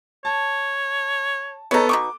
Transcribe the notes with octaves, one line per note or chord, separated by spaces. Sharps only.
C#5 A5
B3 D#4 A4 C#5
B2 D#4 C#6 D6